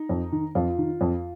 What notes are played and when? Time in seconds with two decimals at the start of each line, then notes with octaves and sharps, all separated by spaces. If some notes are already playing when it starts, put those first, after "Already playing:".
Already playing: D#4
0.09 F2
0.32 D#3
0.55 F2 F4
0.78 D#3
1.01 F2